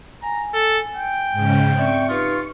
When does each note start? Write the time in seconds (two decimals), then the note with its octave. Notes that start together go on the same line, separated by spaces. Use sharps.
0.22 G#5 A#5
0.54 A4
0.96 G5
1.33 G#2 C#3
1.78 C4 D5 E5 C#6
2.09 D#4 F4 G4 B4